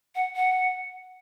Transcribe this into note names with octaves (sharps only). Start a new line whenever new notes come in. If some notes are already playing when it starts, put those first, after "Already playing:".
F#5
F#5